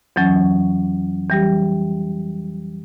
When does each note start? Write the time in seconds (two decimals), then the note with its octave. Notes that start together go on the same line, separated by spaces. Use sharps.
0.16 F2 E3 F#3 C#4
1.29 E3 G3 G4